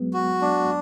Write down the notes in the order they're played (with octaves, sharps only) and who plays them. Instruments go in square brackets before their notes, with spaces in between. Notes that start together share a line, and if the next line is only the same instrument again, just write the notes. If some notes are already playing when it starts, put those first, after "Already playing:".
Already playing: [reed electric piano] F#3 G#3 B3
[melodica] F#4
D4